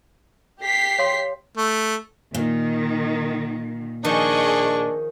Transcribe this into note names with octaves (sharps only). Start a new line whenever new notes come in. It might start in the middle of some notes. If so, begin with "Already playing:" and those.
G4 B6 C7
C#5 F5 C6
A3
A#2 D#3
D#3 F3 D4 G#4 C#5 D#5 C#6